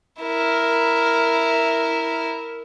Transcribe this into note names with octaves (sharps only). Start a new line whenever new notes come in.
E4 A#4